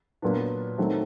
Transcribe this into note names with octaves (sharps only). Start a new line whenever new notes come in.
A#2 F#3 B3 D4
D#3 F#3 A3 C4